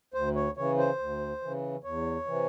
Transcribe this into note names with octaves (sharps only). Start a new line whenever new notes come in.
D2 C5
C#5
C#3 E3 C#5
C5
D2
C#3 E3
E2 C#5
C3 E3